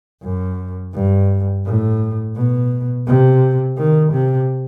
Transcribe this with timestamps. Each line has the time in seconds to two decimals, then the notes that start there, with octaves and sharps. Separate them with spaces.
0.23 F#2
0.94 G2
1.66 A2
2.36 B2
3.07 C3
3.78 D#3
4.13 C3